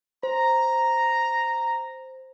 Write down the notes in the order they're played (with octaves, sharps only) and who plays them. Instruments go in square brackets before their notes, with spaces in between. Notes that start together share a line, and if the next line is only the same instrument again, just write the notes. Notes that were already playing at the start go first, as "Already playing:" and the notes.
[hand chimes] C5 [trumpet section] A#5